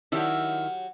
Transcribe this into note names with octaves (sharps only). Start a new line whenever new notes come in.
D#3 F#3 E4 G4 E5